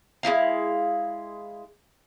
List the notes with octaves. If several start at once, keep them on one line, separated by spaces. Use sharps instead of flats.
G#3 D#4 E4 F5